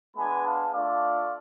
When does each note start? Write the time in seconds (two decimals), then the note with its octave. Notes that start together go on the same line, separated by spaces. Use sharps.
0.15 G#3 B3 D4 G#5 B5
0.44 F5 A5
0.72 A3 D4 F4 D5 F5